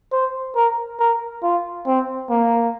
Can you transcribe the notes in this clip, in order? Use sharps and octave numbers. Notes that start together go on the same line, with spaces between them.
C5
A#4
A#4
F4
C4
A#3